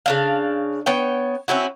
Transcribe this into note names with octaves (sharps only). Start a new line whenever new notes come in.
C#3 D4 F5
B3 C#5 G5
C4 C#4 E4 F#4